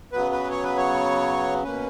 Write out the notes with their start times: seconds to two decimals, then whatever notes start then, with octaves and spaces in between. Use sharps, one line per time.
0.12 C#3 F#3 B3 B4
0.31 B4
0.50 C#5
0.63 B4
0.77 C#5
1.63 B2 A#3 C#4 B4